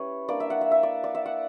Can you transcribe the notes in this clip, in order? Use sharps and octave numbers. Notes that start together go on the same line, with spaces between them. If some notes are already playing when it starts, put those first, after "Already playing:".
Already playing: G3 C#4 E4 B4 C#5
A#3 D4 D5
E5
F#5
E5
E5
D5
D5
E5
F#5